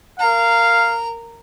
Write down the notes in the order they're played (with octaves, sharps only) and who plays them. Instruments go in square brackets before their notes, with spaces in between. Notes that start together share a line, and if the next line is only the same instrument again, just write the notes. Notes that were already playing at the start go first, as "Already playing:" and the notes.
[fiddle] A#4 A#5 [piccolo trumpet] F5